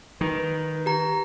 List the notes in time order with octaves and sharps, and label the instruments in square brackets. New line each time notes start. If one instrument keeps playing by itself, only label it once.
[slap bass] D#3 [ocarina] B4
[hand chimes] G4 A#5